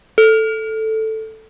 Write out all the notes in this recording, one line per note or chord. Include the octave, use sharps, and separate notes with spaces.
A4